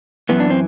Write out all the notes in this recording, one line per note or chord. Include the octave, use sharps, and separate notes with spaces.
F#2 E3 B3
D4
C4